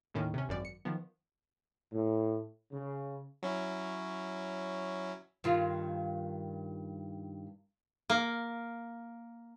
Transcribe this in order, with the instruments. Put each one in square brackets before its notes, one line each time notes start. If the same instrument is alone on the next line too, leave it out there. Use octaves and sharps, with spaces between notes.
[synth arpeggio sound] D#2 A2 D#3 C#4
C3 C#4
G#1 F#2 D5
C#7
D#3 F3 B3
[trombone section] A2
C#3
[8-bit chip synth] F#3 C#4 E4
[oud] G2 D#3 F4
[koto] A#3